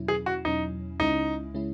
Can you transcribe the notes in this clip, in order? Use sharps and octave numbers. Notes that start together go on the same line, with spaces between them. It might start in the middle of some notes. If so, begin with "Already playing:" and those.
Already playing: E2 B2 F#3 C#4 E4
G#4
F#4
E2 B2 F#3 C#4 D#4 E4
C#2 C#3 G#3 C#4 D#4 E4
C#3 G#3 C#4 E4